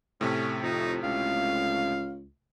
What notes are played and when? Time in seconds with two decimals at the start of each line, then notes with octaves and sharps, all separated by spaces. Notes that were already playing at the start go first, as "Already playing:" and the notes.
0.21 A2 C3 A3 C#4
0.62 F2 D#4
1.04 C#2 F5